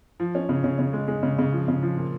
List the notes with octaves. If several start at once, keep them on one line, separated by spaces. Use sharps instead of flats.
F3
C#4
C#3
C#3
C#3
G#3
G#3
C#3
C#3
F3
C#3
F3
A#2